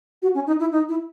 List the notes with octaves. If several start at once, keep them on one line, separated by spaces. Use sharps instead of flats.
F#4
C#4
D#4
E4
D#4
E4